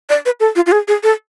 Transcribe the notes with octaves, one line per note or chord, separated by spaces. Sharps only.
D5
B4
A4
F4
F4
G#4
G#4
A4